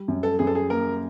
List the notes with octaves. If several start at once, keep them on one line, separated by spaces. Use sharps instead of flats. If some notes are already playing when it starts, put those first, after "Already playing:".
Already playing: G3
F#2
A4
F#2 G#4
A4
G#4
A#3 A#4